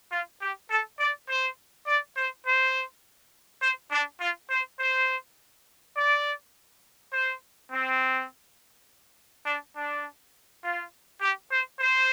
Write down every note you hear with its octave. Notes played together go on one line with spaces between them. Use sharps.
F4
G4
A4
D5
C5
D5
C5
C5
C5
D4
F4
C5
C5
D5
C5
C4
D4
D4
F4
G4
C5
C5